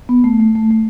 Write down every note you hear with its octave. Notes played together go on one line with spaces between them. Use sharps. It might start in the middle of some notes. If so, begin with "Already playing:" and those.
B3
A3
A3
A3
A3